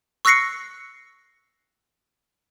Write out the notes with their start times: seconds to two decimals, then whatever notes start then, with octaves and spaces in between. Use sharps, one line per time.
0.25 C#6 E6 F#6 A#6 C7 C#7